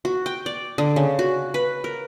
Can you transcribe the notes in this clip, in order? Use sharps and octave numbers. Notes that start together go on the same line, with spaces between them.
F#4
G5
D5
D3
C#3
F#4
B4
A#4